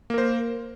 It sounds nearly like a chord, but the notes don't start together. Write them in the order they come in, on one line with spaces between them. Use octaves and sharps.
A#3 A#4 C5